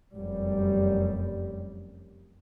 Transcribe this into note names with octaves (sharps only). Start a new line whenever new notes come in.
F1 F#2 G3